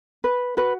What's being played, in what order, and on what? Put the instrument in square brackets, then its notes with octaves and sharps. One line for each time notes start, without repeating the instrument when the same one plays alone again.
[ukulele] B4
F#4 B4